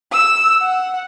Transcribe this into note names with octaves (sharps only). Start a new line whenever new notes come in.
E6
F#5